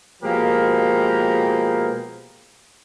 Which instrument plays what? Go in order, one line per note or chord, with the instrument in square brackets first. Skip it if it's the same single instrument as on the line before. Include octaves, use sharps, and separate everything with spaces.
[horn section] B2 F3 G#3 A#3 G4 A#4